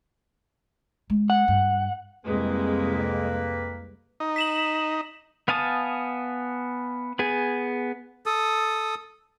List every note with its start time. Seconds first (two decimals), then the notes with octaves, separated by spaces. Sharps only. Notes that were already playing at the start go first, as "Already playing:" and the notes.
1.10 G#3
1.30 F#5
1.48 G2
2.25 C2 F2 G#3 A#3 B4
4.20 D#4
4.36 B6 E7 F#7
5.48 B3 F5 G#5 A5 D#6
7.19 B3 G#4 G#5
8.26 A4 D#6